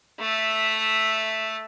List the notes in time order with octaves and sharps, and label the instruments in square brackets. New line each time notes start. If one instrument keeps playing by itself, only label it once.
[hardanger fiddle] A3 E5